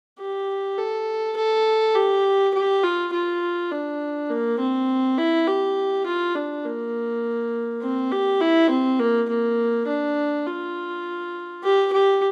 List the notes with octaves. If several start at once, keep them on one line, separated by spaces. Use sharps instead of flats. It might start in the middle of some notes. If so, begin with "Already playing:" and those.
G4
A4
A4
G4
G4
F4
F4
D4
A#3
C4
E4
G4
F4
D4
A#3
C4
G4
E4
C4
A#3
A#3
D4
F4
G4
G4